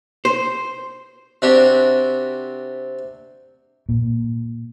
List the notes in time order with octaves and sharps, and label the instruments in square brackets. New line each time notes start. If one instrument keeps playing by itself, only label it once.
[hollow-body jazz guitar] C5
[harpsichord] C3 C4 D4 F#4 G4
[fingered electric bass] A#2